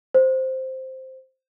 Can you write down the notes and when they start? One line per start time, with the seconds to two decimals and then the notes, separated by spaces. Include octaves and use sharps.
0.15 C5